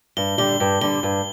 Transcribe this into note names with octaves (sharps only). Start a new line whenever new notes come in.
G2 G7
D3 G3 G7
G2
D3 G3 G7
G2